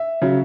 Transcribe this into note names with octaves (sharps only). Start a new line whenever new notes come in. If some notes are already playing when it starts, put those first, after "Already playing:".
Already playing: E5
C#3 F#3